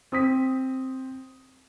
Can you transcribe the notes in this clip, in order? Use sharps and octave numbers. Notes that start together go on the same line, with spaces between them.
C4 D#6 B6